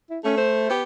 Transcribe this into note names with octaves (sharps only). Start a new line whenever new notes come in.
E4
A3 C#4
C5
B3 G4